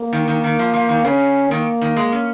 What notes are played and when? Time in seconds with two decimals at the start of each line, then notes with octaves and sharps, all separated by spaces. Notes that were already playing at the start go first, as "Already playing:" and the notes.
Already playing: A#3
0.13 D#3
0.28 D#3
0.44 D#3
0.59 F3
0.73 F3
0.89 D#3
1.05 C#3 C#4
1.50 D#3 A#3
1.81 D#3
1.96 G#3
2.12 C#4